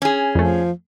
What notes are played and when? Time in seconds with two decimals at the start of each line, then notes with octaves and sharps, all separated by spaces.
0.02 C#4 G#4
0.35 F2 F3 A3